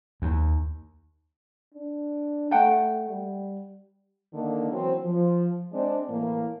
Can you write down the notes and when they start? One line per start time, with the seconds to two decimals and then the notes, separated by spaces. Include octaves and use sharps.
0.22 D#2
1.74 D4
2.51 A3 F#5 G5 A5
3.09 G3
4.34 D3 D#3 A#3
4.71 E3 F#3 C4
5.05 F3
5.72 G#3 C4 D4
6.09 A2 E3 A#3